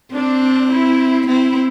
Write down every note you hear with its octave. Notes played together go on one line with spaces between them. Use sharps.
C4 D4
E4
C4 E4